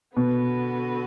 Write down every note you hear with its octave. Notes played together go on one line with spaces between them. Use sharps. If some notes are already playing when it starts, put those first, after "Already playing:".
B2 D3 B3 F#4 B4